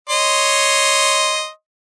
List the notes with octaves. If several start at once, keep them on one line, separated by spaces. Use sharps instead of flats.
C#5 D#5 C6